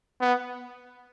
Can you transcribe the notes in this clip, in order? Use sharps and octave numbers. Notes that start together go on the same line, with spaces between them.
B3